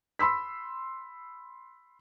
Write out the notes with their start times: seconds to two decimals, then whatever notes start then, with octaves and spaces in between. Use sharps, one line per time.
0.19 B5 C6 E6 B6